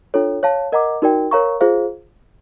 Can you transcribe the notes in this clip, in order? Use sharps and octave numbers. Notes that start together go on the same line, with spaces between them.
D4 F4 A4 C#5
C#5 F5 A5
A#4 D#5 F#5 A#5 D6
D#4 F#4 A#4 D5 G5
A#4 C#5 F5 A#5 C#6
F4 G#4 C5 F5